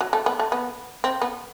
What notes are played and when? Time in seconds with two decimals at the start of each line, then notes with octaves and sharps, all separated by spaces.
0.01 F#3
0.13 A3
0.26 B3
0.39 A3
0.52 B3
1.04 C4
1.22 B3